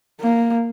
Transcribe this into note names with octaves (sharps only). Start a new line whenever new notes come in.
A#3